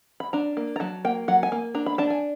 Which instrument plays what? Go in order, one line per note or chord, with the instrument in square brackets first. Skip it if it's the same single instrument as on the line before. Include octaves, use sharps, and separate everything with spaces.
[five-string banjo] B5
D4 A#5
A#3
A#5
F#3 A5
A#3 G5
F#3 F#5
G#5
A#3
D4 A#5
B5
D4 A5
G#5